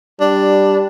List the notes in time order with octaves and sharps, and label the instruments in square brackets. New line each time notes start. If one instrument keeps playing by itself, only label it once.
[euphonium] G3 [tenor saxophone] D4